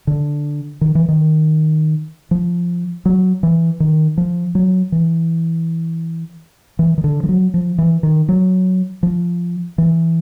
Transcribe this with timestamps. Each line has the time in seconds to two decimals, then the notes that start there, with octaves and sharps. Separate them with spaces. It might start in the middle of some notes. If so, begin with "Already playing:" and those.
0.07 D3
0.81 D#3
0.95 E3
1.08 D#3
2.31 F3
3.05 F#3
3.43 E3
3.80 D#3
4.18 F3
4.55 F#3
4.92 E3
6.79 E3
6.98 D#3
7.04 D3
7.23 F3
7.29 F#3
7.54 F3
7.78 E3
8.03 D#3
8.29 F#3
9.03 F3
9.78 E3